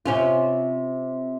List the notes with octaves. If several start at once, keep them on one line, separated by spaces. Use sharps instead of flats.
C3 C#4 F4